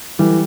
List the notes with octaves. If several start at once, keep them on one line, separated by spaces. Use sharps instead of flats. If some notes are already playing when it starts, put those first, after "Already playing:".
E3 G3